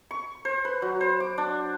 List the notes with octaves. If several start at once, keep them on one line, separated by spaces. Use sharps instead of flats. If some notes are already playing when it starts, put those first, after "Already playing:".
C#6
C5
B4
F#3
C5
D6
D4